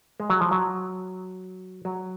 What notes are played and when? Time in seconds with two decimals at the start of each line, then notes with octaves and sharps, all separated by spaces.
0.20 G#3
0.30 F#3
0.41 F3
0.51 F#3
1.85 F#3